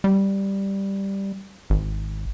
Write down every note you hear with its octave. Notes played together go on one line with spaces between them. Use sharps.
G3
G#1